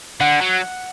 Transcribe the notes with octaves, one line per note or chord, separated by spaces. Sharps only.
D3 F#5
F#3